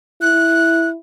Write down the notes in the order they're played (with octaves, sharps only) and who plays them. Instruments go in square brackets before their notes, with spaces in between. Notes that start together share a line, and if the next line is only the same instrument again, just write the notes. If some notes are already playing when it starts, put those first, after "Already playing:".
[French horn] E4 [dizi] F#6